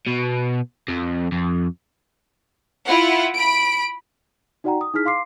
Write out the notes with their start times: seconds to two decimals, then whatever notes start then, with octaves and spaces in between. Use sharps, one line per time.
0.07 B2
0.89 F2
1.32 F2
2.88 E4 F4 F#5
3.35 B5 D7
4.64 D#4 F#4 D5 F#5 G5 A#5
4.81 D#6
4.94 D#4 E4 G#4 F6 B6
5.05 F5 C6 D6 C7